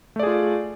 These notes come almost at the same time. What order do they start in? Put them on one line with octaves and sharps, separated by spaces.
A3 D5 G#4 F4